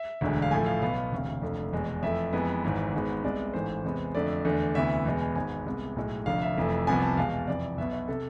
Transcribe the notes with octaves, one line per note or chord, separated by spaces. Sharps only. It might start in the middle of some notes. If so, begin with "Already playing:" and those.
Already playing: E5
E1 D2 D3 G#3
F5
A1 A2 F3 A3 G#5
F5
B1 B2 B3 F5
F5
E1 D2 C3
F1 F2 D3 A3
F1 E2 B2 G#3
F2 E3 A3 E5
F2 E3 G#3 B3
G#1 G#2 E3
G#1 G#2 G#3 B3
C2 C3 G#3 B3 D5
A1 G#2 E3 A3 C5
E2 C3 G#3 B3
F2 D3 A3 D5
E2 D3 A3
D2 C3 E3 B3 E5
E2 B2 G#3 B3
G#5
G#1 G#2 G#3 B3 G#5
C2 C3 G#3 B3
B1 A2 G#3
F1 F2 D3 F5
E5
F1 F2 E3 A3
C2 C3 F3 B3 G#5
A5
E2 B2 G#3 F5
F2 C3 E3 D5
B1 B2 B3 E5
E5
C3 A4